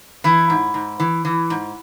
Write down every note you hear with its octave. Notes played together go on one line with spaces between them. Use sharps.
E3 E4
G#2
G#2
E3
E3
G#2